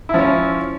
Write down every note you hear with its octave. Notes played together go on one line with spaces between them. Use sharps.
F3 C#4 E4